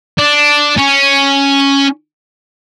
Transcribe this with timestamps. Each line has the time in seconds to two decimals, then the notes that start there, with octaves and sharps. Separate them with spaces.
0.18 D4
0.78 C#4